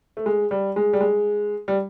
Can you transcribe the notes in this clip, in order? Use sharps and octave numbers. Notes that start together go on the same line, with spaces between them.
A3
G#3
G3
G#3
G3
G#3
G3